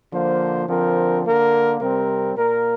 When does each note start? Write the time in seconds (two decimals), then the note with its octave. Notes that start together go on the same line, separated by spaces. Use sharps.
0.13 D3 F3 A#3 C5
0.68 D3 F3 C4 A#4
1.25 D3 A#3 A#4
1.81 C3 G3 C4 A#4
2.37 A#2 A#3 A#4